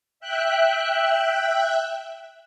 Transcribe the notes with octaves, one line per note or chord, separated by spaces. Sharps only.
E5 G5 F#6